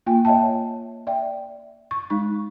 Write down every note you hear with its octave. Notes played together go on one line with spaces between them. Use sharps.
A#3 F4 G5 G#5
C#5 D#5 E5 G5 A5
D5 E5 G5
C#6
G#3 D#4 C#6